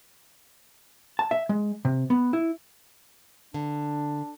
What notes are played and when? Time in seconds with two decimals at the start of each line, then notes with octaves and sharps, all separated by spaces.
1.19 A5
1.31 E5
1.49 G#3
1.85 C3
2.10 B3
2.33 E4
3.54 D3 D4